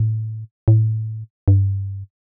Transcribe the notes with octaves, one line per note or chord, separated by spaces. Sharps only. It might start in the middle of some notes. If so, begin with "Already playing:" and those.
Already playing: A2
A2
G2